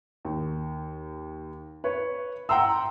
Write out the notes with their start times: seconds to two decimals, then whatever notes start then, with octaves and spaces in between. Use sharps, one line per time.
0.25 D#2
1.84 B4 C#5
2.49 F#5 G5 A#5 C6 E6